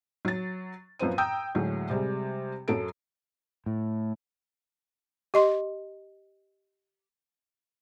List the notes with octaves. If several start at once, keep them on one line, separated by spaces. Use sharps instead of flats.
F#3 A6
F#2 F3 B3 C5 D#7
G5 A#5 D#6 E6 G6
D2 A2 F#3 G#3
C3 G3 G#3
F#2 F#3 A4 D7
A2
G4 D#5 C6